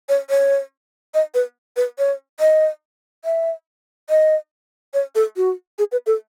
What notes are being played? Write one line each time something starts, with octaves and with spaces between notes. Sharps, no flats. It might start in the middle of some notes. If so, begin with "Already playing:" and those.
C#5
C#5
D#5
B4
B4
C#5
D#5
E5
D#5
C#5
A4
F#4
G#4
B4
A4